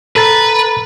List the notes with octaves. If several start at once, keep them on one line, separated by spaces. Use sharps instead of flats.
A4 B4 A#5 A6